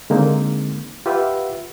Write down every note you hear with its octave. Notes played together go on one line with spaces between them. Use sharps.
D3 G#3 A#3 C4 D#4
F4 G4 B4 E5 F#5